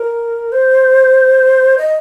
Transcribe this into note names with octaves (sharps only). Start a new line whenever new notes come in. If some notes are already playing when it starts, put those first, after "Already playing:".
Already playing: A#4
C5
D#5